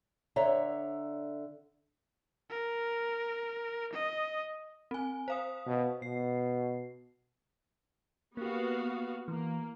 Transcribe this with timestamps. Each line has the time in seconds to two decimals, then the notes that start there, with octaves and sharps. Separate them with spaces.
0.36 D3 C#5 E5 A#5
2.50 A#4
3.93 D#5
4.91 C4 G#5
5.28 C5 F5 D#6
5.66 B2
6.02 B2 C7
8.37 A#3 B3 F#4 G4 F5
9.28 E3 A#3